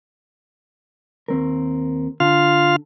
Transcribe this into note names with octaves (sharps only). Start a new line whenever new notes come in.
D#2 C4 A#4
D3 F4 F5